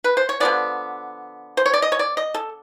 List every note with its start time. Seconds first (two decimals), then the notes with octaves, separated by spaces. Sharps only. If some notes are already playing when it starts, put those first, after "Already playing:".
0.04 B4
0.17 C5
0.29 C#5
0.40 D3 F3 G#3 B3 D5
1.57 C5
1.66 C#5
1.74 D5
1.82 D#5
1.92 C#5
1.99 D5
2.17 D#5
2.34 A4